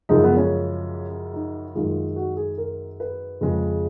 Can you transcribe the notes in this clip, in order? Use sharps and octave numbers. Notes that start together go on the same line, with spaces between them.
F#2 C#3 F3 G#3 D#4
B3
C#4
D#4
F#2 D#3 G#3 F4
F#4
G#4
A#4
B4
F2 C#3 F3 G#3